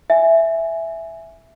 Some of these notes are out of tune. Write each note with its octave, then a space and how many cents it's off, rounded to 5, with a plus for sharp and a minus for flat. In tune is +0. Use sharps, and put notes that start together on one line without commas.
E5 +0 G#5 +0